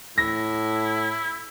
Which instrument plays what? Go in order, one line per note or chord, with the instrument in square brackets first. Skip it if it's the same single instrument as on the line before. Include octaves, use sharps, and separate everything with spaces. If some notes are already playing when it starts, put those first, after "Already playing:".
[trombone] A2 [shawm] E4 [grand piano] A#6